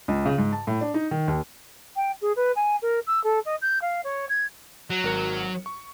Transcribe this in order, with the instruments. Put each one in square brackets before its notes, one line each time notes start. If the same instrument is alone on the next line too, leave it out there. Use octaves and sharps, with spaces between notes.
[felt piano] C#2
C#3
G#2
A5
A2
D4
D#4
D#3
D#2
[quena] G5
G#4
B4
G#5
A#4
E6
A4
D#5
G6
F5
C#5
G#6
[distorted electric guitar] F#3
[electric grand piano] G#1 A#4 C#7
C#6